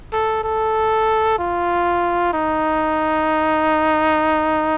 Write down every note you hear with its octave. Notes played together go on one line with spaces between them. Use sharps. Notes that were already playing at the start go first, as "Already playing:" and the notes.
A4
A4
F4
D#4